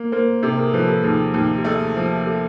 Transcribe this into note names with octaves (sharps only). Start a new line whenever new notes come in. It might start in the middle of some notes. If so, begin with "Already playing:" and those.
Already playing: A#3
A#3 A#4 C5
C3 G4 A4
G#4 A#4
F3 A4 B4
G4 A4
D#2 G#4
D#2 G4
G4
A3 G#4
F3
G4 A4